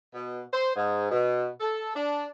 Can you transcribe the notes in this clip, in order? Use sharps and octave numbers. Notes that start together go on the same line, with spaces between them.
B2
C5
G#2
B2
A4
D4